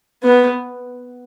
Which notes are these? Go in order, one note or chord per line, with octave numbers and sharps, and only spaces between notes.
B3